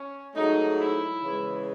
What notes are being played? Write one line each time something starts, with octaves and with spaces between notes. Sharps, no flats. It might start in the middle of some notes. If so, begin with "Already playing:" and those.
Already playing: C#4
G#2 F#3 A3 D#4
E4
C#3 E3 G#3